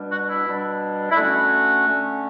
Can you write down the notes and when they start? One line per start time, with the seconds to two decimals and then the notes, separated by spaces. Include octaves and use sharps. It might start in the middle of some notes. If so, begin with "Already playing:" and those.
Already playing: B2 G3 D4
0.10 F#4
0.27 E4
0.45 B2 G3 D4
1.11 E4
1.15 D3 A3 C#4 F#4
1.86 D3 A3 C#4